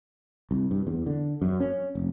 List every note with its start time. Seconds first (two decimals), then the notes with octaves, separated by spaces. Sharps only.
0.51 C2
0.71 G2
0.87 E2
1.06 D3
1.42 F#2
1.60 C#4
1.95 F1